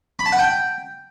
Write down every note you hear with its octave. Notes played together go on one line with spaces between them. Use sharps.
B5
A5
F#5
G5